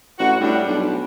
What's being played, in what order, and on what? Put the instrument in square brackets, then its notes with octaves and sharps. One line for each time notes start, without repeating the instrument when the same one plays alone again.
[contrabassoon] A1 [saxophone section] F#4
[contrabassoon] A2 [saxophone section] G3 D4
[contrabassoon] B1